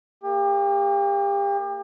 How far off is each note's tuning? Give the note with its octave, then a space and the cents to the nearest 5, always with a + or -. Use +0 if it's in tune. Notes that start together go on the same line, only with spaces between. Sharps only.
A#3 -15 G4 +35